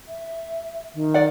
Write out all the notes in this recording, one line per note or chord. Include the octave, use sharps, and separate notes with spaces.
E5
D#3
D5 F#5